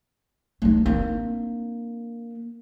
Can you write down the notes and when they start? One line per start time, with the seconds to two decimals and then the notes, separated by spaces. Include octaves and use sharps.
0.62 A3 D#4
0.86 A#3 C4 D4